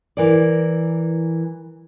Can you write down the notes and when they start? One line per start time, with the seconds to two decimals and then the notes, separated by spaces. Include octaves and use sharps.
0.17 E3 A#4 D5